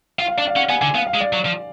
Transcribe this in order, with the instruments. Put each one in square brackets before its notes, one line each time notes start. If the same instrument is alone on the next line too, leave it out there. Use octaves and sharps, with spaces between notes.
[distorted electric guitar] F4 [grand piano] F5
[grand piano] F5
[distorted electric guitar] D4 [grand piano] D5
[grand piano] F5
[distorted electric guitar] C#4 [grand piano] F#5
[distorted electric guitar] B3 [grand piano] G#5
[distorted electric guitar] D3 [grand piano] G#5
[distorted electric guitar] B3 [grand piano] F5
[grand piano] F5
[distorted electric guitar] G#3
[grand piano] D5
[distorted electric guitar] F#3
F3